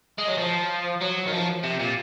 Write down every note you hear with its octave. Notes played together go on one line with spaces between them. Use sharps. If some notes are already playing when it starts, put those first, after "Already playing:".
G#3
F#3
F3
F#3
D#3
F3
C3
A#2